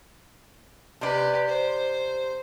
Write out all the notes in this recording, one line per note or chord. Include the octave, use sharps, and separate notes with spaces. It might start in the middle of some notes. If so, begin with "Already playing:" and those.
C3 G4 B4 D5
C5